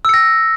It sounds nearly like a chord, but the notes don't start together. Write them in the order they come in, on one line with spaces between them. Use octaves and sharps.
E6 C#7 A#6